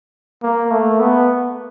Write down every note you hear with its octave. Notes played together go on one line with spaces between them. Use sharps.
A#3
A3
B3